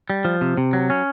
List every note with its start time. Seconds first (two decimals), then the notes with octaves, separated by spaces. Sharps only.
0.10 G3
0.25 F3
0.41 C3
0.57 C3
0.73 F#3
0.90 C#4